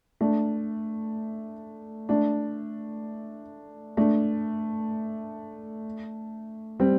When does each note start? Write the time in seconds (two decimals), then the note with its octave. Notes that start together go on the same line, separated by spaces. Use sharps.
0.21 A3 D4
2.09 A3 D4
3.97 A3 D4
6.79 G3 C4